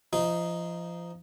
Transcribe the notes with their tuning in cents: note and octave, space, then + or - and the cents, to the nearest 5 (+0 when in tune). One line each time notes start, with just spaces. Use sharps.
F3 -25 D#4 +0